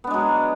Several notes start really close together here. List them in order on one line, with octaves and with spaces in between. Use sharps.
B3 D4 G#3 F#3